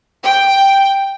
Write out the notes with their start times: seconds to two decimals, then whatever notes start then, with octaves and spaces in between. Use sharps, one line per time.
0.24 G5